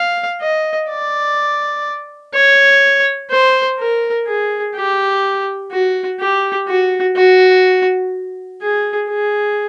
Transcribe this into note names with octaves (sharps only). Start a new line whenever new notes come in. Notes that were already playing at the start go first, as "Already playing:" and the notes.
Already playing: F5
D#5
D5
C#5
C5
A#4
G#4
G4
F#4
G4
F#4
F#4
G#4
G#4